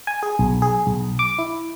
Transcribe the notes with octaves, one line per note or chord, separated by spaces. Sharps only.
G#5
G#4
B1
G#4
B1
D6
E4